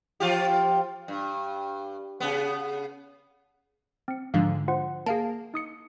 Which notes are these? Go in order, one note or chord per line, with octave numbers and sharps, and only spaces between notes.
F3 F4 G4
G2
C#3 B3
C4 C#7
G#2 D3 F3 F5
F4 C5 F#5
A#3 G#4 F5 A5
D#4 D#6 C#7